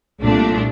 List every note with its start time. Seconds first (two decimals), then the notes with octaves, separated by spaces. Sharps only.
0.21 C2 A#2 A3 D4